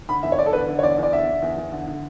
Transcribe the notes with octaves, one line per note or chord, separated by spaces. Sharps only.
D3 B5
E2 E5
C#5
E2 D5
A4
D3 B4
D3
C#5
E2 D5
E2 D5
D3 E5
D3
E2
E2
D3
D3